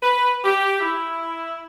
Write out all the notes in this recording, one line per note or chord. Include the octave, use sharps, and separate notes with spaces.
B4
G4
E4